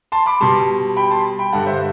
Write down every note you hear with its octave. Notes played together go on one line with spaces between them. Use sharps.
A5 C6
B5 D6
B2 G3 A5 C6
G5 B5
A5 C6
G5 B5
G2 D3 G3 F#5 A5
C5 E5